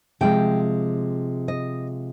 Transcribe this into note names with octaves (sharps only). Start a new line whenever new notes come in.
C3 F3 G#3 G5
D#5